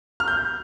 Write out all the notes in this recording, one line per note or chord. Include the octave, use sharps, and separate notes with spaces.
F6
G6